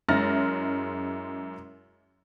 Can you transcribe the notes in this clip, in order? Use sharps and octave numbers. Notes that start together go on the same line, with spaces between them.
F#2 G#3 E4 F6 A6 A#6